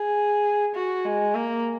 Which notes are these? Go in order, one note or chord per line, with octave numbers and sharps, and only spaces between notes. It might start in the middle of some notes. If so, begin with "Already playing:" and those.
Already playing: G#4
F#4
G#3
A#3